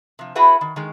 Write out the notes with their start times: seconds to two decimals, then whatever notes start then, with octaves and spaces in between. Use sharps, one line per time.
0.19 C3 F3
0.35 E4 F#4 G#4 B4 E5 F#5
0.61 D#3
0.76 D#3 G#3